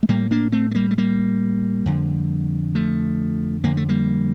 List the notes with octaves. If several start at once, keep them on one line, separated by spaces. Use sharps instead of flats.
A3
A2 G3 A#3
A#3 D4
A3 C4
A3
G3 A#3
A3
G3 A#3
F2 D3
F3 A3
F2 D3 A#3
A3
G3 A#3